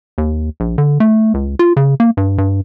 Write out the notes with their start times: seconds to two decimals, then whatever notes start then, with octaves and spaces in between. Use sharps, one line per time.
0.18 D#2
0.60 A#1
0.78 D3
1.00 A3
1.34 C#2
1.59 F4
1.77 C#3
2.00 A#3
2.17 G2
2.38 G2